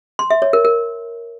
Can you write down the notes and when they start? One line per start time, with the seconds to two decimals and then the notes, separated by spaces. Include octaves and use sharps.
0.19 C6
0.30 E5
0.42 C#5
0.53 A#4
0.65 A#4